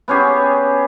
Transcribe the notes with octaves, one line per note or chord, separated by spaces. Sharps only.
B3 C#4 G4 G#4